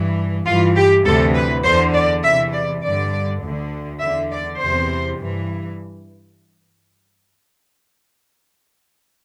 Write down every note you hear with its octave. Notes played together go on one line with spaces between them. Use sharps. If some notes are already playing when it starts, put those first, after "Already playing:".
Already playing: G2 E3
G2 E3 F4
G4
D2 C3 E3 A4
B4
E2 D3 C5
D5
E2 C3 E3 E5
D5
G2 D3 D5
D2 D3
E2 D3 E5
D5
E2 C3 E3 C5
G2 E3